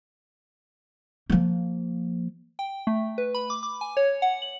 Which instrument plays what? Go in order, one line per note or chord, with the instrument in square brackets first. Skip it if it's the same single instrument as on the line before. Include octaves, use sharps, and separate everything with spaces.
[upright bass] F3 A#3
[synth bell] G5
A3
B4
B5
D6
D6
G#5
C#5
F#5
F#7